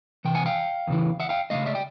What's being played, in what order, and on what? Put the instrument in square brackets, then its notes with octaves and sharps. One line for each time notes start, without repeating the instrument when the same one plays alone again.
[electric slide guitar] C3 E3 G5
F#5 G#5
F5 G5
E2 C#3 E3
E5 F#5
F5 G5
C#3 F3 A3 D#5 F5
D5 E5
G5